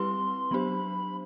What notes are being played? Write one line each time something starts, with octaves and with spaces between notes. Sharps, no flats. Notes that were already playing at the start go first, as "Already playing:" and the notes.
Already playing: G3 C4 E4 G4 B4 C6
F#3 B3 D4 G4 C5 B5